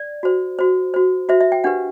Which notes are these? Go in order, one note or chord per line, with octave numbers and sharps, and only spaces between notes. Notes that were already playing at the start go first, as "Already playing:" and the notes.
Already playing: D5
F#4 C5
F#4 C5
F#4 C5
F#4 C5 E5
E5
G5
D4 G4 B4 F#5